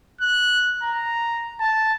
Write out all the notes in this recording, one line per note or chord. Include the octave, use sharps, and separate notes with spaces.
F#6
A#5
A5